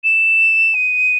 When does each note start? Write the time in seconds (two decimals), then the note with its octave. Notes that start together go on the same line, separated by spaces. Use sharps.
0.04 E7
0.75 D#7